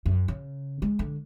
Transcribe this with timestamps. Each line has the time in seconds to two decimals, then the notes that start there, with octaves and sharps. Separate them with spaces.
0.06 F#2
0.28 C#3
0.82 G#3
0.99 D3